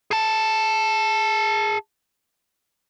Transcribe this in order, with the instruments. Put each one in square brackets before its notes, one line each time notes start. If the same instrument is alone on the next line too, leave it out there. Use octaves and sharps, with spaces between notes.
[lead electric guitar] G#4 A5